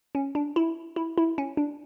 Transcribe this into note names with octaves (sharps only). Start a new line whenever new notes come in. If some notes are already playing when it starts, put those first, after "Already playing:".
C#4
D4
E4
E4
E4
C#4
D4